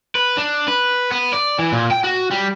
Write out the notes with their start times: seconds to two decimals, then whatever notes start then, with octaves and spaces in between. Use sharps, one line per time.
0.15 B4
0.37 D4
0.68 B4
1.11 B3
1.33 D5
1.59 E3
1.72 A#2
1.91 G5
2.04 F#4
2.31 G3